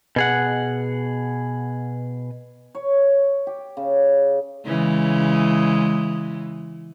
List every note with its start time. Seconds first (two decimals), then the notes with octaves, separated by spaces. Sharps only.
0.16 B2 G#4 F#5
2.75 C#5
3.47 G4
3.77 C#3
4.65 C#3 E3 G#3